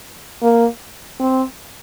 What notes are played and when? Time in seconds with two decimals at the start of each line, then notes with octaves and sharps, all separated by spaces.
0.42 A#3
1.20 C4